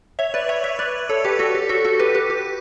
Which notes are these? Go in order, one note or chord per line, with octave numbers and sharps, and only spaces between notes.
C#5 E5
B4 D5
C#5 E5
C#5 E5
B4 D5
A4 C#5
G4 B4
F#4 A4
G4
F#4 A4
F#4 A4
G4 B4
G4 B4
G4